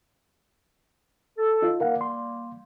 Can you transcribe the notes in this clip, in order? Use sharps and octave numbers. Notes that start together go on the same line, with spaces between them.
A4
D#4 F4
G3 A#3 A#4 F5 F#5
C6